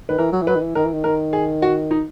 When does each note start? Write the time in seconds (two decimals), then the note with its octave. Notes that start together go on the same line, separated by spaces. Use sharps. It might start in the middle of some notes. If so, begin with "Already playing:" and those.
0.09 D#3 B4
0.18 E3 A#4
0.33 F#3
0.42 E3
0.47 F#3 B4
0.56 D#3
0.62 E3
0.75 D#3 A#4
0.85 E3
0.93 D#3
1.04 D#3 A#4
1.33 G#4
1.62 F#4
1.91 D#4